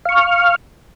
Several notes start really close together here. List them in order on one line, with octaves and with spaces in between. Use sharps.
F5 C#6 F6